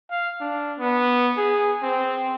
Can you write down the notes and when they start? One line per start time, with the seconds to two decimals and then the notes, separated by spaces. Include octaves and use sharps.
0.11 F5
0.40 D4
0.79 B3
1.38 G#4
1.82 C4